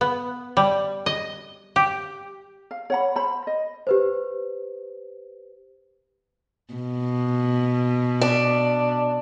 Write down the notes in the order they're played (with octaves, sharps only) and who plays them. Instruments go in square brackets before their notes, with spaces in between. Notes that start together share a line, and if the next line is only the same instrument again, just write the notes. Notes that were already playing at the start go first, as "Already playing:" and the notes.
[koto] B3
G3
D#5
G4
[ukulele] F5
C#5 F#5 B5
C5 B5
D#5
[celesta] G4 B4 C5
[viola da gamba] B2
[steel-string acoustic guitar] D4